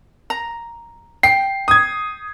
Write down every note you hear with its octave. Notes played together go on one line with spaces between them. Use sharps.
A#5
G5 C7
D#6 G#6